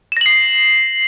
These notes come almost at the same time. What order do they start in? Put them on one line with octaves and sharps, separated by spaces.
E7 A#6 F#7 C7